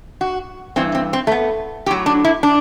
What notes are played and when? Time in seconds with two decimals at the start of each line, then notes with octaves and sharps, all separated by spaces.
0.21 F#4
0.76 G2 E3 C4
0.95 C4
1.13 C4
1.27 A3
1.32 B3
1.86 A2 F#3 G4
2.06 D4
2.24 E4
2.43 D4